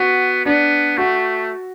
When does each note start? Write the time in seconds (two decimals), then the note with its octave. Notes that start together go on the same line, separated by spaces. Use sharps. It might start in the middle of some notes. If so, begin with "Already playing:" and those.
Already playing: B3 F#4
0.45 B3 D4
0.97 A3 F#4